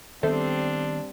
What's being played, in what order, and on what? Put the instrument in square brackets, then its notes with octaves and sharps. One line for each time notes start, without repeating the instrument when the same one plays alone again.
[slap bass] D#3 B3 [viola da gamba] G3 C4 [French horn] D4 [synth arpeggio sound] A4 C5 E5